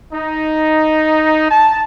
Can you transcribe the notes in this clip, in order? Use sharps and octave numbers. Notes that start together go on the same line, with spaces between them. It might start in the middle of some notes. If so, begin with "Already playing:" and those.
D#4
A5